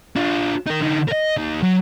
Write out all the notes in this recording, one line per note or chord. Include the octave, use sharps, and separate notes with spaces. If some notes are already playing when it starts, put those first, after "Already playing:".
D4 F4
D#4 A#4
D3 D#4
A#4 D#5
D#2 D#3
F#3